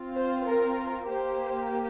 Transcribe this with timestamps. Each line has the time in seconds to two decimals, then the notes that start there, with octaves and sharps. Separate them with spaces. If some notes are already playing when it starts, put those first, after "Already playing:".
Already playing: C4 F4
0.16 C5
0.47 A#4
1.09 A#3 G4 C5